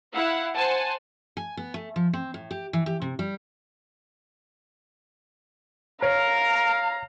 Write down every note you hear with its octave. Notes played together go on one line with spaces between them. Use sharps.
E4 F5 F#5
C5 F#5 G#5 A5
G#5
B3
A3
F3
C4
A2
G4
E3
G4
C3
G3
A#4 C#5 F5 A#5